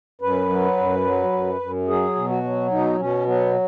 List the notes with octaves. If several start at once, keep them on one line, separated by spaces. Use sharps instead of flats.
F#2 B4
F#3
F#2
F#3
F#2
F#2
F#3 G#4
B2
F#4
F#3
B2 D#4
B2 C#4
F#3 B3